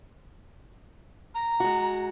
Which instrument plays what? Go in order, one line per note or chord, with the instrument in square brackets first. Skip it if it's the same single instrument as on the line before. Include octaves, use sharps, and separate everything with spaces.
[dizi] A#5
[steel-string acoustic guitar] G#3 F#4